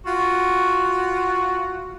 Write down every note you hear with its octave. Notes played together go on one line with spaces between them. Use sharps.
F4 F#4